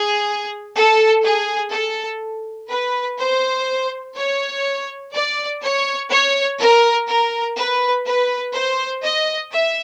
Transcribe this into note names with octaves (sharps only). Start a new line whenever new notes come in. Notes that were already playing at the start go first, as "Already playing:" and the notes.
Already playing: G#4
A4
G#4
A4
B4
C5
C#5
D5
C#5
C#5
A#4
A#4
B4
B4
C5
D#5
E5